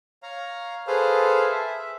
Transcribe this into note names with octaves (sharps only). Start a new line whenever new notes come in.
C#5 F5 A#5
G#4 A4 B4 C5 F5
E5